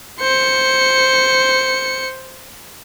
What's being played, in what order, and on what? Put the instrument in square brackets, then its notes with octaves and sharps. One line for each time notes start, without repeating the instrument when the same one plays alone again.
[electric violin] C5 C#7